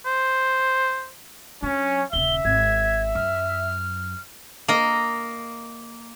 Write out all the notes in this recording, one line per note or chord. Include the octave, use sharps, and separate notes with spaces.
C5
F#3 C#4 D4
D#1 C#3 E5 G7
G#1 G#6
F#2 F6
A#3 A#4 D#5